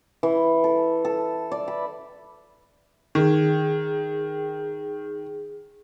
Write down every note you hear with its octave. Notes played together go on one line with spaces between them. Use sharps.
E3
A4
A4
D5
B5
D#3 G#4